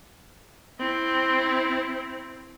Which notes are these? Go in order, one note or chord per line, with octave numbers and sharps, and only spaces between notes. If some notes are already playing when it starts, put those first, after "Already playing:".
C4 E4